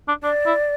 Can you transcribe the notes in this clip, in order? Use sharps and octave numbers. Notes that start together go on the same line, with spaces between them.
D4
D4 D5
E4